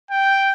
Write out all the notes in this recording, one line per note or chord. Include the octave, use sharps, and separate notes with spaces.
G5